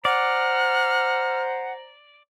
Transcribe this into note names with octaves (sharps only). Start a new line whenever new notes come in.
C5 D5 F#5 A#5 F6